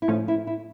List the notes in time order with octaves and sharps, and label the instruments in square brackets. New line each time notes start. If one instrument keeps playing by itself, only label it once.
[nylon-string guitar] E4
[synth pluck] A2 F3 A3 C#4 [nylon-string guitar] D#4
[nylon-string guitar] E4
E4